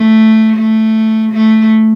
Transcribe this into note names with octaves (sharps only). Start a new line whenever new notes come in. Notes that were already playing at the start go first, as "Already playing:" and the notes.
Already playing: A3
A3
A3